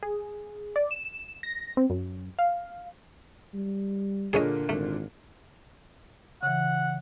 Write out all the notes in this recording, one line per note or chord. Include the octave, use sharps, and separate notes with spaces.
G#4
D5
E7
A#6
C4
F#2
F5
G3
A#2 D3 A#3 G#4 C#5 D#5
G#1 A3
C#3 E3 F#5